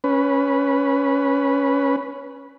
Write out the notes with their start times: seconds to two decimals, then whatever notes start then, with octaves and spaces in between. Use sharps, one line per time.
0.04 C#4 B4